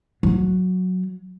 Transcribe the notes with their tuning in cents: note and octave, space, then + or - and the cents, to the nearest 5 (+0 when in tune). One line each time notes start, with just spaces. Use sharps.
F#3 -5